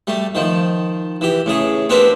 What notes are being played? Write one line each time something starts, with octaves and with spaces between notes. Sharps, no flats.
G3 A3
D#3 F3
E3 G4
A2 C#3 G#4
B3 C4 D4 G4 A#4 B4